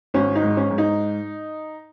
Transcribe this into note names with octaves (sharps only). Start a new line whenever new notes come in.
G#1 C#4
D#4
G#2
C#4
G#2
D#4